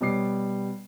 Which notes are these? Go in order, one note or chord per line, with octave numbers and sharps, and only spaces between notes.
B2 G3 C#5 D6 C7